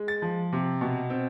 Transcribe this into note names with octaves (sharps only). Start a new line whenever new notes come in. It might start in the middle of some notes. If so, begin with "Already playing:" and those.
Already playing: G#3
A6
F3
C3
B2
C4